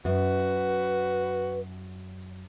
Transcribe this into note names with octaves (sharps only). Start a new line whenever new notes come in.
F#2 F#4 B4